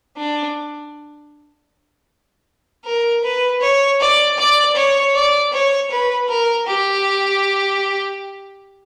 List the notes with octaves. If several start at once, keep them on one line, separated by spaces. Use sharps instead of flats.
D4
A#4
B4
C#5
D5
D5
C#5
D5
C#5
B4
A#4
G4